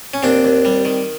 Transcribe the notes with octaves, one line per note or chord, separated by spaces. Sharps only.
C#4
D#2 C4 D4
D#2
G3
D#3